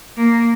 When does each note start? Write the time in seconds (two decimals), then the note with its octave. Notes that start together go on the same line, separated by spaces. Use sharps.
0.16 A#3